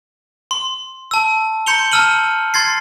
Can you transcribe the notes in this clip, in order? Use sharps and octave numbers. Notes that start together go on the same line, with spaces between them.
C6
A5 E6
A#5 C6 G6 C#7 F7 G7
A5 A#5 E6 F6 D#7 F#7
C6 G#6 A6 C7